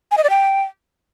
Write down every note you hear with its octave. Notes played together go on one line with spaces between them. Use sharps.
G#5
D#5
D5
G5